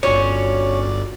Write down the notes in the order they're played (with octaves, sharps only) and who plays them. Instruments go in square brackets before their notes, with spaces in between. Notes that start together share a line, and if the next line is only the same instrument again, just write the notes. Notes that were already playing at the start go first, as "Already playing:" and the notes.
[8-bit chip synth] G1 D5 [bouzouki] C#4 [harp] D4 F4 F#4 [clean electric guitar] C#5